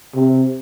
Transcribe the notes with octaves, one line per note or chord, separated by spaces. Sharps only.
C3